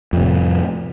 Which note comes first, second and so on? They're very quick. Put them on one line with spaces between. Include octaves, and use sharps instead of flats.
F2 C3 A2